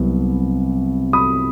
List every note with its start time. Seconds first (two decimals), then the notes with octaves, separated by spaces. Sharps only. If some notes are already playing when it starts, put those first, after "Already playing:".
Already playing: C2 C3 F#3 B3
1.13 B5 D#6